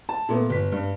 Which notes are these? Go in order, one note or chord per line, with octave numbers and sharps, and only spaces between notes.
A5
A#2 A3 B3
G1 B6
G2